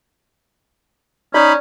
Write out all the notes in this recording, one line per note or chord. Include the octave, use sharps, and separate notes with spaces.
C#4 D#4 D5 B5